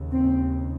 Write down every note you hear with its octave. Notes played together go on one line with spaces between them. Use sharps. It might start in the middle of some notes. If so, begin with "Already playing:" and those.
Already playing: D#2 C#3
C4